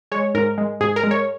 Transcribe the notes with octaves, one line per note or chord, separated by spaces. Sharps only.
G#3 C#5
G#2 A#4
G#3
G#2 G#4
A#4
G#3
C#5